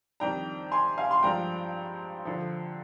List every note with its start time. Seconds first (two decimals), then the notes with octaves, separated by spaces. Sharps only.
0.20 F2 D#3 G3 D4 G5 A#5
0.72 G#5 C6
0.98 F5 G#5
1.11 C6
1.23 G2 F3 G#3 D4 G5 A#5
2.25 D3 F3